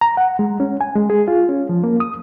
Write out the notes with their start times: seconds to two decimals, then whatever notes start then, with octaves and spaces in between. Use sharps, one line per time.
0.01 A#5
0.17 F#5
0.39 G#3
0.60 C#4
0.81 G#5
0.95 G#3
1.10 G#4
1.28 F4
1.49 C#4
1.69 F3
1.84 A#3
2.00 D#6